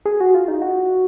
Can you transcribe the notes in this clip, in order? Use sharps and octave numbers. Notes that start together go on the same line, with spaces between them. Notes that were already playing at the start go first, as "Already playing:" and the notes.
G#4
F#4
F4
D#4
F#4